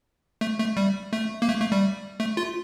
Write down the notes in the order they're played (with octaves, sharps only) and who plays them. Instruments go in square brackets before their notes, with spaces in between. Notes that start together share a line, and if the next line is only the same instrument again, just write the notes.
[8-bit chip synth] A3
A3
G3
A3
A#3
A3
A3
G3
A3
F4